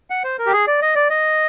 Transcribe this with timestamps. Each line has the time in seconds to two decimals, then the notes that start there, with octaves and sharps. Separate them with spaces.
0.10 F#5
0.24 C5
0.39 A#4
0.46 G4
0.53 G#4
0.67 D5
0.82 D#5
0.95 D5
1.10 D#5